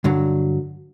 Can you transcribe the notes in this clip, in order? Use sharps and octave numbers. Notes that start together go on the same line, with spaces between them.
G2 D3 F#3